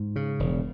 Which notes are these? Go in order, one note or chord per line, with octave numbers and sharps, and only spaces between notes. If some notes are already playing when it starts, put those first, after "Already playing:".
Already playing: G#2
C#3
E1